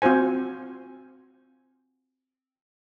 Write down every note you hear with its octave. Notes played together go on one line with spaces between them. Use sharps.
C4 F4 F#4 C5 G#5